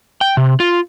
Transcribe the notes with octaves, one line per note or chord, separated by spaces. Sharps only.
G5
C3
F4